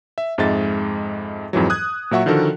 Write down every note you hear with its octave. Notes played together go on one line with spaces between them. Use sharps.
E5
F2 G#2 G#3 D#5 E5 A6
F2 G#2 E3 F#3
D#6 F#6 G#6
A#2 F#3 E5 F#5 C#6
D3 D#3 F3 F#4 A4 A#4